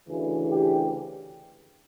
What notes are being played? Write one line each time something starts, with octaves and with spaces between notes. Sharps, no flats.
D2 C#3 E3
G4